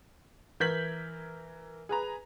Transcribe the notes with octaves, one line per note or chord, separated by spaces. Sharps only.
E3 A#4 G6 G#6 B6 F#7
G#4 B4 A#5